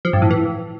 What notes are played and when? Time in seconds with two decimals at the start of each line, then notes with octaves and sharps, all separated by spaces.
0.05 F3
0.13 G2
0.22 A2
0.31 E3